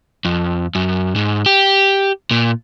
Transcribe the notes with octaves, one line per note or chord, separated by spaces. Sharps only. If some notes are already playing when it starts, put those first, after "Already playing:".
F2
F#2
G#2
G4
A#2